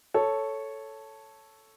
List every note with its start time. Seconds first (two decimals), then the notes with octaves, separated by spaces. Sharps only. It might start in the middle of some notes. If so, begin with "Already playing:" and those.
0.14 A4 C#5